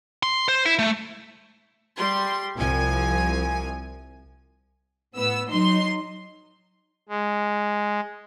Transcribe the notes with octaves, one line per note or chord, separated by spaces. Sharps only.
C6
C5
E4
A3
G3 C6
C2 F3 G#5
A2 B3 E6
F#3 D#4 C6
G#3